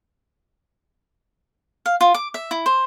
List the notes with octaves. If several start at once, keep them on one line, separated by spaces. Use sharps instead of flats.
F5
F4
D6
E5
E4
C5